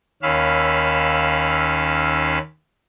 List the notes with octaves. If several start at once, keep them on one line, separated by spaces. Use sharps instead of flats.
D#2 C#4 F5 B5 E6